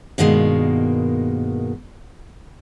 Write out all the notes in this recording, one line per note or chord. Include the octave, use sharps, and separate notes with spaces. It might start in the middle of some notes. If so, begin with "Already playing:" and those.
G2 B2 D#3 G#3 A#3